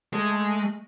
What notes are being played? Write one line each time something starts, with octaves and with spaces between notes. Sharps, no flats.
G#3 A3